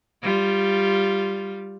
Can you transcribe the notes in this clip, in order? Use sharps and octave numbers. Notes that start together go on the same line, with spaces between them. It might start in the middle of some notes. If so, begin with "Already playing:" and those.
G3 F4